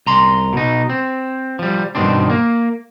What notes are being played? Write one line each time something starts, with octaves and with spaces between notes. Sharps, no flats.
C2 A#5 C6
B2 D#4
C4
F3 G3
G2 B2 D#3 C4 D4
A#3